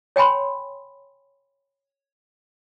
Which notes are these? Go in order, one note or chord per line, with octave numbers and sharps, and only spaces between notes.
C#5 G5 G#5 B5 C6